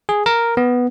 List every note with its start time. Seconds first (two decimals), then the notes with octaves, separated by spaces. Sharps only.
0.09 G#4
0.26 A#4
0.57 B3